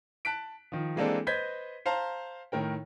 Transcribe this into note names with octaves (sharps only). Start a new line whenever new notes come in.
A5 F#6 B6 D7
D#3 F3
E3 G#3 A#3 C4 D4 A4
B4 C5 D#5 G6 G#6 B6
C5 F5 A5 A#5 C6
A2 D#3 A#4 G5